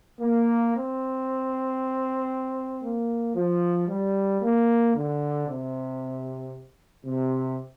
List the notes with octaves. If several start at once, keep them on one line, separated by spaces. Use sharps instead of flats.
A#3
C4
A#3
F3
G3
A#3
D3
C3
C3